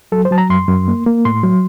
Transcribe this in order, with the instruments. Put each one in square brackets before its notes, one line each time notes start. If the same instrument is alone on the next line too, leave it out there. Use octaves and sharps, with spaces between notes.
[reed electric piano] F#3 A4
C5
F#3 A5
A#5
F#2 C6
F#2
A#3
A#3
A2 C6
F#3